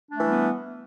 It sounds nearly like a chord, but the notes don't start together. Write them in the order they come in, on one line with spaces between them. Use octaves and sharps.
D4 A3 E3 G3 B3